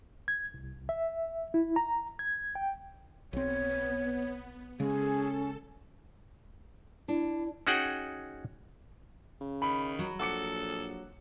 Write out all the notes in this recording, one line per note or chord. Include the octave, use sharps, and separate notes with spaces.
G#6
C2
E5
E4
A#5
G#6
G5
B1 B3 C4 C#5
C#3 G#3 C#4 G#4 A4
D4 E4
C#4 D#4 F#4 G#4 F#5 G5
C#3
D#3 B5
F#3
A#1 A4 F#5 D6 C#7